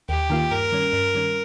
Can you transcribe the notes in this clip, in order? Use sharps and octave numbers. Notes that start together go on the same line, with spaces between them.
D#2 G4
D#3 A#3 F4
G2 A#4
D#3 G3 C#4
G2
D#3 G3 C#4